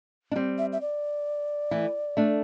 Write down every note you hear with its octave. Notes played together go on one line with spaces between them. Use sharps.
D4
G3 C4
E5
E5
D5
E3 A3
A3 D4